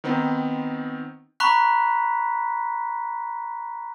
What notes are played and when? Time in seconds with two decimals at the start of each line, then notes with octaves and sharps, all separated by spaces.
0.04 D#3 B3 C4 D#4
1.40 A#5 B5 C#6 F#6 B6